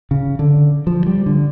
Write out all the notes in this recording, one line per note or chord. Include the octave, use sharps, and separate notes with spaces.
C#3
D3
F3
G3
D3